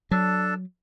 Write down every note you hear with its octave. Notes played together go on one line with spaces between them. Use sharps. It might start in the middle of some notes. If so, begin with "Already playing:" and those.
F#3 D4 A4 A5